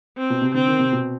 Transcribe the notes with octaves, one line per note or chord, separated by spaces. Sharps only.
C4
B2
C3
D3 C4
D#3
C3
B2